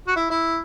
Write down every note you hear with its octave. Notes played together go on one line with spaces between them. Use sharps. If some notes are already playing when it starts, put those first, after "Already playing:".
F#4
E4
E4